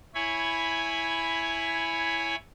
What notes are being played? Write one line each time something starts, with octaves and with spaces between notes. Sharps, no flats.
E4 C#5 G#5 B5